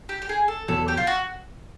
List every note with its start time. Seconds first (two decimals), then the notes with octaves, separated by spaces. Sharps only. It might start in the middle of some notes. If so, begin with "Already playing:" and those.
0.09 G4
0.22 G4
0.29 G#4
0.48 A4
0.68 E2 B2 F#3 A4
0.88 G4
0.97 F4
1.07 F#4